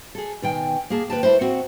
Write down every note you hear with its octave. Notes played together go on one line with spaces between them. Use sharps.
G#4 A4
B2 D#3 G5 G#5
A#3 G#4 A5
D#2 B4 G5 A5
A3 E4 B4 C5
C4 F#4